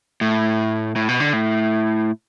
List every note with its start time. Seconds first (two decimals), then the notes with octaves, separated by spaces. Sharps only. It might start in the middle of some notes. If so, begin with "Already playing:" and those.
0.21 A2
0.96 A2
1.09 B2
1.20 D3
1.33 A2